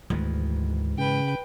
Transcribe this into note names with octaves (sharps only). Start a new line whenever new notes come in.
D2 G#2 D#3 E3
C#3 B4 G5